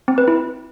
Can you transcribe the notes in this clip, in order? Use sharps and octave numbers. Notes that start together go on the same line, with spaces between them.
C4
B4
E4